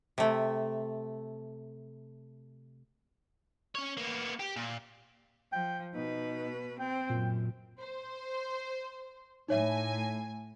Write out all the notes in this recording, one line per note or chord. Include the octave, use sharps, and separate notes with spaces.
C3 A3
C#4 C#5
A#3 B3
G4
A#2
F3 G5
B2 D#4 B4
C4 G5
F#2 A#2
C5
A2 D#4 C#5 E5 G#5